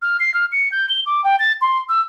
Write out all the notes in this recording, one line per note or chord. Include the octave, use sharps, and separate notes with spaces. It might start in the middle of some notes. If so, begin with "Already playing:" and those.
F6
C7
F6
C#7
G6
G7
D6
G5
A6
C6
E6